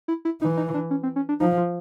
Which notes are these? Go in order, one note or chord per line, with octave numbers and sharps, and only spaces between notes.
E4
E4
E3 D#4
D#4
D4
C#4
C4
C#4
D4
F3 D#4
F4